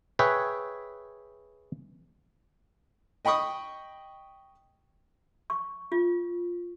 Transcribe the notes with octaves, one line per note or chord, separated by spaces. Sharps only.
G#4 B4 C#5 E5 G5
D#5 G5 B5 C#6 D#6
C#6
F4